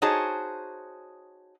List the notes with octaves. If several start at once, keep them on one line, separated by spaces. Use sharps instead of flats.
D#4 F#4 G#4 C5 C#5 A5